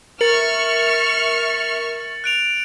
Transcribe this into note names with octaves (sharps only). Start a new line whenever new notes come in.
A#4 E5 C#6 F6 A6 C#7 F#7
F#6 D7 F7